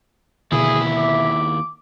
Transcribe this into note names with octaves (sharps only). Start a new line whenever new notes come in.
D#2 B2 D3 E4 G#4 E5
D6